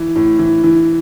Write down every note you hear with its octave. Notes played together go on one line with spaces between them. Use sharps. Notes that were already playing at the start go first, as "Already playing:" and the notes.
Already playing: E3
A2
E3
E3